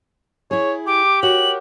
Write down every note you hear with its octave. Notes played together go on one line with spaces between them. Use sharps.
E4 G#4 C#5
G4 D6
F#4 A#4 C#5 F#7